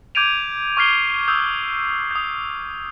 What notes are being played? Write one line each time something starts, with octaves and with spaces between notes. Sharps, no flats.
D6 G6 G#6 D7 D#7 F7
C#6 D6 F6 G#6 C7 G7
D#6 E6 G6
D#6 G6